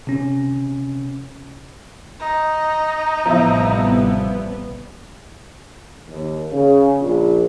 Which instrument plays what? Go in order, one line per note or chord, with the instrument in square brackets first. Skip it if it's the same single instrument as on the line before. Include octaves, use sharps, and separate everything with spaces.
[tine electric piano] C3 C#4
[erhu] D#4
[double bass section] A1 C3 G3 [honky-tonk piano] F3 E4 [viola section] B3
[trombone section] D#2
C#3
A#1